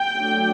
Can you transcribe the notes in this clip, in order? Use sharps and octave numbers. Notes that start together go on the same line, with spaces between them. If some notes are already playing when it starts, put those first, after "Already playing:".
Already playing: G5
F#3 A3 D4